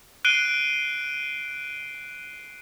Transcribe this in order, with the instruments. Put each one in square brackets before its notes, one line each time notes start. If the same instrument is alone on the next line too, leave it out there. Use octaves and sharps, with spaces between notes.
[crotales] F#6 C7 D7 D#7 G7